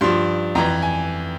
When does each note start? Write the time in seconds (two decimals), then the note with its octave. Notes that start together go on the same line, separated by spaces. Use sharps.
0.01 G2 F3 C6
0.55 F2 E3 A#5
0.82 G#5